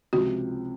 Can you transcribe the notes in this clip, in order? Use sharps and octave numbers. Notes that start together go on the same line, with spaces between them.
C#2 C3 F3 F#4